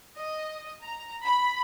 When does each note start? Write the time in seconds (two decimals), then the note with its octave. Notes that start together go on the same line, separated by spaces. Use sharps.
0.17 D#5
0.81 A#5
1.25 B5